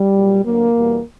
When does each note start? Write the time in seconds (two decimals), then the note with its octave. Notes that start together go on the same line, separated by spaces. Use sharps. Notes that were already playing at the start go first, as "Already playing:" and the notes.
Already playing: G3
0.14 A#2 F#3
0.44 D2 D3 F#3 A#3
0.75 E2 B2 G3